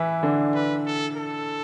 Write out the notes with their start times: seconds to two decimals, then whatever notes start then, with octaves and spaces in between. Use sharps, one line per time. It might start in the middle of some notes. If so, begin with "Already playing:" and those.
Already playing: E3 E4 B4
0.23 D3 D4
0.54 B4
0.86 A4
1.16 A4